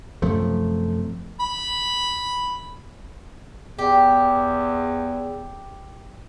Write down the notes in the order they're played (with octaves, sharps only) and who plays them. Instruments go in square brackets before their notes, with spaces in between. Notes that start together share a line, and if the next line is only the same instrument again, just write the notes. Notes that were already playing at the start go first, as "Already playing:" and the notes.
[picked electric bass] F#2 C3 F3 A3
[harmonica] B5
[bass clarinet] E2 [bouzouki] G4